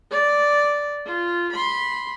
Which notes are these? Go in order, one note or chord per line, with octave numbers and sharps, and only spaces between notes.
D5
F4
B5 C6